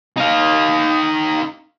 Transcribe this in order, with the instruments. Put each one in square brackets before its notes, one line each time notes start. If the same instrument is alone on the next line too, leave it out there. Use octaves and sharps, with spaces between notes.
[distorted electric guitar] D#4 F5